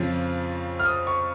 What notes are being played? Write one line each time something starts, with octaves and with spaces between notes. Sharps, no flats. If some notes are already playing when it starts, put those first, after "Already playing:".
Already playing: F2 C#3 F3
F6
D#6
C#6